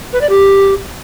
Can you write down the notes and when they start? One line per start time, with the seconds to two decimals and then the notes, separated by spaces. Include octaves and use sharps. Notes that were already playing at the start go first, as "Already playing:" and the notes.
0.13 B4
0.21 D5
0.29 G4